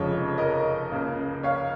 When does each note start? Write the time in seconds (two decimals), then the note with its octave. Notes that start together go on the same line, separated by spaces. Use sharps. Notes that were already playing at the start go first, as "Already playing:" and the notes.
Already playing: F1 F2 C#3 F3 G#3 C#5
0.38 A#4 D#5
0.92 C#2 C#3 A#3
1.43 C#5 F5